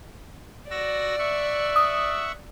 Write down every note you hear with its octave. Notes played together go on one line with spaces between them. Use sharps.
F#4 D5 E6 A#6
E5 F#5 C#6
D#6